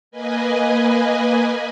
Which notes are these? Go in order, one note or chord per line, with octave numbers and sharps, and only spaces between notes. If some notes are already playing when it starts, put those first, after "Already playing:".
A#3 B4 D#5 G#5